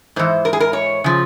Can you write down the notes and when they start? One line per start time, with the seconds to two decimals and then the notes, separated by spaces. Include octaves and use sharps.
0.16 G#2 E3 C5
0.45 A#4
0.53 G#4
0.60 A#4
0.73 C#5
1.04 C#3 F3